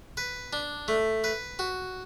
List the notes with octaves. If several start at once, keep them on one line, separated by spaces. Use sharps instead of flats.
B4
D4
A3
B4
F#4